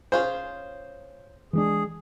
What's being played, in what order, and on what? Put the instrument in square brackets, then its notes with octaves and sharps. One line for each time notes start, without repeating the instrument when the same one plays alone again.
[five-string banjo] C#4 F4 G#4 [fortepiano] C5
[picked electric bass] E3 G#3 D4 [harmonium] G#4